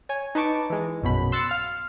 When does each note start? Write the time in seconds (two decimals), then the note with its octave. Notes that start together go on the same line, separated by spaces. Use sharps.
0.09 C#5 G#5
0.35 D#4 B4 A5 C#6 D6
0.70 E3 G#3
1.02 A#1 F#2 B2 B5
1.32 C6 E6 F#6 A6 C7 C#7
1.49 F5 F6